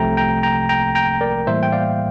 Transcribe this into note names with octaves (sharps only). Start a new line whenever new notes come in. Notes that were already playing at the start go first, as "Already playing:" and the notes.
Already playing: C2 C3 F3 A3 G5 A#5
G5 A#5
G5 A#5
G5 A#5
G5 A#5
A#4 D5
A2 E3 G3 A#3 C5 E5
G5
D5 F5